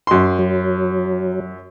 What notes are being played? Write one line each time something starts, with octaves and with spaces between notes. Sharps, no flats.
F#2 C6
F#3